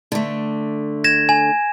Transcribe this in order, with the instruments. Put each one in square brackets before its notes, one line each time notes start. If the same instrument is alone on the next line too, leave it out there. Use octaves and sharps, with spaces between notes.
[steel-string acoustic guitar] D3 A3
[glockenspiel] G#6 A#6 E7
G#5